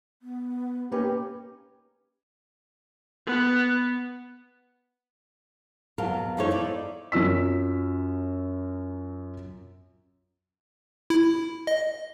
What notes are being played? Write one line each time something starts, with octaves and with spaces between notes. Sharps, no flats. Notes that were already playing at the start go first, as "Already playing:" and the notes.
B3
A#3 C#4 D#4 G4 B4
B3
F2 B2 F#3 A#4 F5 A5
F#2 E3 F3 D#4 A4 C#5
D#4 E4 D5
F#2 F#3 F4 E6 B6
E4
D#5